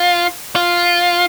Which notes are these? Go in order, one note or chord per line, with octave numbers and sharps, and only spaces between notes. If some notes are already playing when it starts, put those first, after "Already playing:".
Already playing: F4
F4